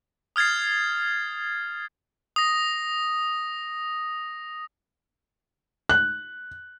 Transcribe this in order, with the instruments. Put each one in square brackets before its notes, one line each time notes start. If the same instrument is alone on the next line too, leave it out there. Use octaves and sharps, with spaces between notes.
[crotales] D#6 F6 G#6 A6 C7
D#6 A#6
[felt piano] F#6